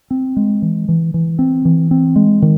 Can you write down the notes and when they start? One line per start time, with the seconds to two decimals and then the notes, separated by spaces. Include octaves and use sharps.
0.11 C4
0.36 G#3
0.62 E3
0.88 E3
1.14 E3
1.39 C4
1.65 E3
1.91 C4
2.16 G#3
2.42 D#3